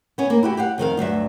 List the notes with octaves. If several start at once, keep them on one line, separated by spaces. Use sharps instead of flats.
B3 C#4
A#3
E4 F#4 G4
G4 F5 F#5
F2 D#3 G#4 F5
D2 G2 F#3 E5